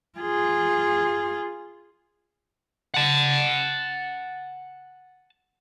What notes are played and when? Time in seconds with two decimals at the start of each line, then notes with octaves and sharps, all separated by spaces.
0.19 F4 G#4
2.94 F#5 A5